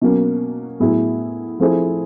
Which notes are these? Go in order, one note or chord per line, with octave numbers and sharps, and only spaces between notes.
B2 F#3 A#3 C#4
A2 F#3 B3 E4 G#4
F3 A3 C4 E4 G#4